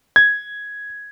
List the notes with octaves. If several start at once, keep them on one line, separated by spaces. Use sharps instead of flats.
G#6